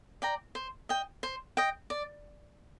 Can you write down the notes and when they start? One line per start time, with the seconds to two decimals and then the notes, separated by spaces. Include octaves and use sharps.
0.22 D5 G5 A#5
0.55 C5
0.89 D#5 G5
1.23 C5
1.57 D#5 G5
1.90 D5